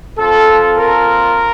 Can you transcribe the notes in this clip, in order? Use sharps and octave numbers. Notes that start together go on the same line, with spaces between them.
C4 F4 A4
A#4